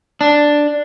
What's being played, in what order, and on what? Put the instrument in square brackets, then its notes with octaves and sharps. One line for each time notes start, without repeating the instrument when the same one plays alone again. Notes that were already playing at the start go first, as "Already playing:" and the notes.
[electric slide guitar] D4